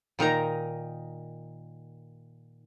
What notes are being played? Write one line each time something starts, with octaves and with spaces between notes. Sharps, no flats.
A#2 D#3 D#4 A#5